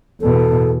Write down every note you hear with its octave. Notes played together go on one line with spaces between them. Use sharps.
E2 B2 A4